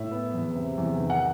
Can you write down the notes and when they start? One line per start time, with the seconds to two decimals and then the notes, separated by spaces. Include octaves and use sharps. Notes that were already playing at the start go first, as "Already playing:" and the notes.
Already playing: A2 E5
0.11 B3
0.34 E2
0.55 C3
0.78 E2
0.99 D#3
1.10 F#5